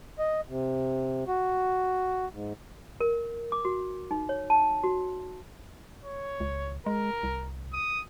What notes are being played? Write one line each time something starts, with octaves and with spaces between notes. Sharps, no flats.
D#5
C3
F#4
G#2
A#4
D6
F#4
D#4
C#5
A5
F#4
C#5
C#2
G#3 A#4
C2
D#6